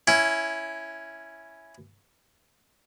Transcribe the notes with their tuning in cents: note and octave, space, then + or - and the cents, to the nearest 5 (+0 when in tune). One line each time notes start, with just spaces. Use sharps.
C#4 +0 E4 +0